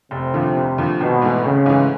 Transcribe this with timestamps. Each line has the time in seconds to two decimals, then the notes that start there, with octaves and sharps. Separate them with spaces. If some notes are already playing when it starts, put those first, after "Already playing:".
0.11 F1 C3
0.34 D#2 D3 F3
0.56 F1
0.78 D#2 D3 F3
1.00 G#1 B2
1.22 G#2 E3 A3
1.44 G#1 C#3
1.66 G#2 E3 A3